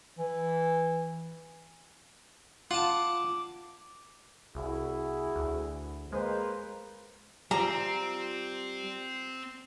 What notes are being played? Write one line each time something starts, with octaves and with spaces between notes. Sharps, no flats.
E3
F4 F#5 A5 D6
C2 E4 F#4 G#4
D2
G#3 A#3 B4 C5
G3 C4 F4 A#5